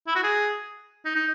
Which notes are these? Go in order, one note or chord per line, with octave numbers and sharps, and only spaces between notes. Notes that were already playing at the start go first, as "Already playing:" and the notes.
E4
F#4
G#4
D#4
D#4